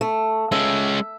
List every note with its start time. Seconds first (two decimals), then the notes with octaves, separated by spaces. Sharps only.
0.01 A3
0.52 G#3 C#4 E5